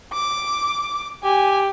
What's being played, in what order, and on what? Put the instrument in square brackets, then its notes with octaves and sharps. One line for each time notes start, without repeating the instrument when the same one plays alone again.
[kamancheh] D6
[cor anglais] G4 [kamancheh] G#5